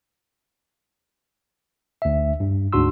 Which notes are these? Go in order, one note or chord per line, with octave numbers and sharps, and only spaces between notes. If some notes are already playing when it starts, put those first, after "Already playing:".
D2 E5
G2
D2 G#2 D4 F#4 C6 E6